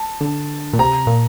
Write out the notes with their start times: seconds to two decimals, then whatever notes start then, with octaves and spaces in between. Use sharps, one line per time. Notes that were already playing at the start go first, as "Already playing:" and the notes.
Already playing: A5
0.21 D3
0.73 A#2
0.79 C3 A#5
1.07 A#2